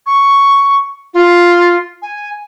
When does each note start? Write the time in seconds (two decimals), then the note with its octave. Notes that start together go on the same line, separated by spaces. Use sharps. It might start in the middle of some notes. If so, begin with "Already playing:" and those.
0.06 C#6
1.14 F4
2.02 G#5